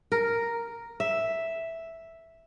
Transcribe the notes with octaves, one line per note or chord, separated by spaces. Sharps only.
A#4
E5